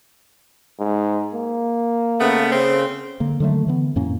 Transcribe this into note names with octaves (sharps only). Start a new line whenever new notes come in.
G#2
A#3
C#3 A3 B3
C#3 C4
D3 A#3
D3 D#3 F#3 A3
D3 E3 B3
F2 A2 A#3 C#4